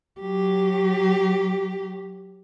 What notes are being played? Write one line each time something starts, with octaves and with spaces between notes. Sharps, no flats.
F#3 G4